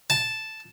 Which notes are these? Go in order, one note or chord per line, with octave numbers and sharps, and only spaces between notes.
A5